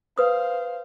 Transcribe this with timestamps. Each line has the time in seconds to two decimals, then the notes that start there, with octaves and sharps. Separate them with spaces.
0.18 B4 C5 F5 D#6